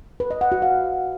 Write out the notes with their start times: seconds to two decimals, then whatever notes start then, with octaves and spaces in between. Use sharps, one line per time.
0.20 B4
0.31 D#5
0.41 F#5
0.52 F#4
0.62 F5